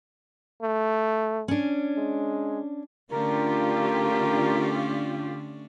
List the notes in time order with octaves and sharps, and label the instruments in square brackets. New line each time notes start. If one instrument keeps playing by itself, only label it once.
[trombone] A3
[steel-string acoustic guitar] C#4 D4
[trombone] G#3
[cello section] D3 F4 G4 [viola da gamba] A3 C#4 D4 [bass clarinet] A#4